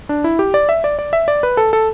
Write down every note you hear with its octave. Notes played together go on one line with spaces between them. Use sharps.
D4
E4
G4
D5
E5
D5
D5
E5
D5
B4
A4
A4